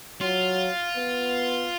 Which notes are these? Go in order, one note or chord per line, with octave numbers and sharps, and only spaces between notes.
F#3 F4
B3